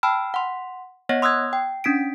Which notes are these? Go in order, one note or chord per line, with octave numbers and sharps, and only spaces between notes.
G5 A5 B5 E6 F6
F#5 C6
B3 C#5 D#5 F#5 A#6
C6 D#6 E6 F#6 G#6
G5
C#4 D4 B6 D7